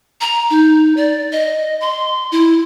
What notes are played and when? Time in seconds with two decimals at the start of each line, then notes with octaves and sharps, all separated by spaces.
0.21 A#5
0.50 D#4
0.97 D5
1.32 D#5
1.81 C6
2.32 E4